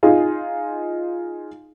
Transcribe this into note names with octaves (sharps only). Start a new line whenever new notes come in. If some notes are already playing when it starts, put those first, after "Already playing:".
D#4 F4 G#4